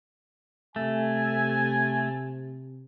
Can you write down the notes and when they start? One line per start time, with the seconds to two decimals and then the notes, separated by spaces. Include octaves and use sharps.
0.76 C3 A3 G#5